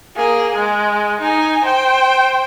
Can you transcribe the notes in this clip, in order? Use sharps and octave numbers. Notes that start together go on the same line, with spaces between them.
A#3 G#4
G#3
D#4 G#5
C5 G5